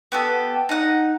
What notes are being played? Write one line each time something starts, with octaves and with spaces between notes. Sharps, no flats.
B3 G4 A4
D#4 F#5